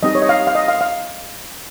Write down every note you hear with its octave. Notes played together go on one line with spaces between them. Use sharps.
G3 C4 D#4 G4 D#5
C#5
D#5
F5
F5
D#5
F5
F5